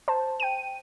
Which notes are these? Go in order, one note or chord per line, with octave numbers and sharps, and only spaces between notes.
C5 A5
G5 D#7